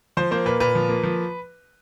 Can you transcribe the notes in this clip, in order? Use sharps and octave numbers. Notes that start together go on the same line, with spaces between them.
F3 C5
A#3 C5
A#2 B4
A#2 B4
F3
A#3
F3